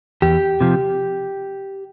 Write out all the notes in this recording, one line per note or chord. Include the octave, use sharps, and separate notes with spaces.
E2 G4
C3 F3